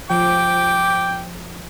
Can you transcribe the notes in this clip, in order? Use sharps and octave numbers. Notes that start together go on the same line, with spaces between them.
F3 G5 D6